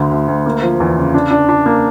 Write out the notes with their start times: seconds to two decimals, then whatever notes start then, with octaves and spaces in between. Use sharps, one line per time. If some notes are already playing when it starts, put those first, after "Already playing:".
Already playing: D2 D3
0.11 D2
0.28 D2
0.46 A#3
0.62 F3
0.80 E2
0.97 C#3
1.14 D4
1.31 D4
1.49 D4
1.66 A#3